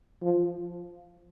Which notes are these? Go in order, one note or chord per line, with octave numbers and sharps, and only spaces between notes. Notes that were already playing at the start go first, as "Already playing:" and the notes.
F3